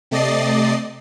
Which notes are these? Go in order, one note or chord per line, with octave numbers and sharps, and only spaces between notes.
C3 A3 D5 D#5 A6 C7